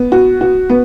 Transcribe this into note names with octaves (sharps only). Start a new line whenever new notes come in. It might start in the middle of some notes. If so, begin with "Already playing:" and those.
Already playing: B3
F#4
F#4
B3